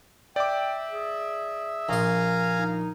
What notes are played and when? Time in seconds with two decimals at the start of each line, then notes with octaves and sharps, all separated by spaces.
0.36 D5 E5 G5 D6
0.91 G#4
1.89 A#1 F5 G#5 A#5 C6
2.58 D#4